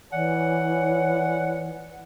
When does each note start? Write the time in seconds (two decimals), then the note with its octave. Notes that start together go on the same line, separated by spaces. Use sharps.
0.13 E3 C#5 D5 F#5 G#5